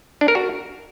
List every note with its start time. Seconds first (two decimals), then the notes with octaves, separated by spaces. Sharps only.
0.21 D4
0.28 A#4
0.35 F#4